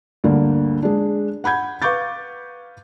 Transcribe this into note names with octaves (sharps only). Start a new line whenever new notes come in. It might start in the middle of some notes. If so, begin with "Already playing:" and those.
D2 G2 D3 A#3
G#3 D4
F#5 B5 G6 G#6
B4 F5 C#6 D6 G6 A6